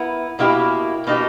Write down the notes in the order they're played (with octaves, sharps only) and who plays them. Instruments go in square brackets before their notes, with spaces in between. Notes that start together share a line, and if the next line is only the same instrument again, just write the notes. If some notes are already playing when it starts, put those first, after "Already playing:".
Already playing: [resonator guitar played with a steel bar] B3 E4 A#4
B2 A#3 E4 G4
B2 A#3 D#4 G4